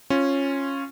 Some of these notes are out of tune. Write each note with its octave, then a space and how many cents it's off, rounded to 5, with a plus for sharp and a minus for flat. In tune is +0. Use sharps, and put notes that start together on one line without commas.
C#4 -10 F4 +0